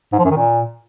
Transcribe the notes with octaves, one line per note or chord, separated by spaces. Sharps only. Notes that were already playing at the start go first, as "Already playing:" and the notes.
G#2
F3
F#2
D#3
A#2